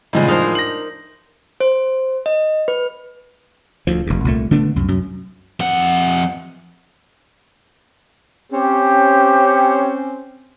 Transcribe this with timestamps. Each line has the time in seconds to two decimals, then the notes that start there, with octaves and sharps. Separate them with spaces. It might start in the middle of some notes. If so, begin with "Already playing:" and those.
0.13 A2 C#3 F3 G3 G#3 D#5
0.28 D4 D#4 A#4 C5 A#5
0.55 A#6 F#7
1.60 C5
2.26 D#5
2.68 B4
3.87 D2 F3
4.07 F1 D#2
4.25 C2 A#2 A3
4.51 D3 A3 B3 D4
4.76 C2 F#2
4.88 F#2
5.60 F2 F#5
8.53 C4 C#4 G4